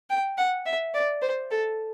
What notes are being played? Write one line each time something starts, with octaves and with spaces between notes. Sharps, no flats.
G5
F#5
E5
D5
C5
A4